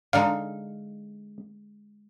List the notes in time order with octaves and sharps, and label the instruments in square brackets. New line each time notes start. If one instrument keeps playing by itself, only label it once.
[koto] D3 G#3 D#4 [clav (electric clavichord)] F5